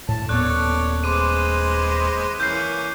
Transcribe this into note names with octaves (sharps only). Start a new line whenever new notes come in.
A2 A5
D#1 B3 A4 C#5 D5 F#6
G#3 B4 C5 D6 D#7
E3 A#3 C#4 G6 C7